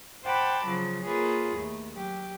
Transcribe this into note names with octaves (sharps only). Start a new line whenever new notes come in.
C5 F#5 G5 A5 B5 D6
C#3 F3 F#3
A#3 F4 G#4 B4 C#5
D#2 A3
F#3 G4